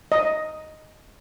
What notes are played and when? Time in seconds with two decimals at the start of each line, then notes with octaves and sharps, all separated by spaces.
0.12 D#5